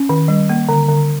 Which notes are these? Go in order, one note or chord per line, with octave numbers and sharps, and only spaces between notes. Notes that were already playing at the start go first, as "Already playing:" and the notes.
Already playing: C#4
D#3
G3
A#3
D3
D3